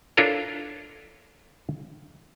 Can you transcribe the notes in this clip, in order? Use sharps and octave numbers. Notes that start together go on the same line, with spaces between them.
D4 E4 F4 A4 A#4 C#5